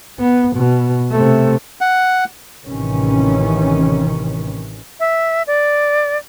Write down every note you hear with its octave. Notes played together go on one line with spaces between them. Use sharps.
B3
B2
C3 A3
F#5
A1 C3 D#3 E3 C#4
E5
D5